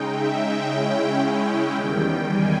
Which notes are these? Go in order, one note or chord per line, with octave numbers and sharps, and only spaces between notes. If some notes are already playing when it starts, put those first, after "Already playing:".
Already playing: C#3 G#3 D#4 G5
E5
C#3 G#3 C#4 E4 G5
G5
E2 D#3 G3 G5
G#5